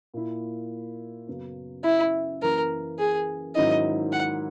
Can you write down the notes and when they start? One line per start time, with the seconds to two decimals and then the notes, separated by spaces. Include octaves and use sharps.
0.14 A#2 A#3 E4
1.27 F#2 C#3 F#3 B3
1.84 E4
2.42 F#2 E3 A#3 A#4
2.99 G#4
3.55 G#2 D#3 F#3 C#4 E4 D#5
4.12 F#5